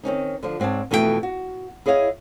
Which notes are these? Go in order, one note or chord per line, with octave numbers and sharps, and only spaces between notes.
D#3 C4 C#4 D#4
D3 F3
G#2 C4 C#5 D5 A5
F2 B2 E3 A3 F4 G5
F#4
E4 G#4 C#5 D#5 F5